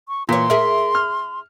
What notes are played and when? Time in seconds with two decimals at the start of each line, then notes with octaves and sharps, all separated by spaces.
0.08 C#6
0.29 A#2 E3 C#5 C6
0.50 G#4 A#4 E5
0.95 F6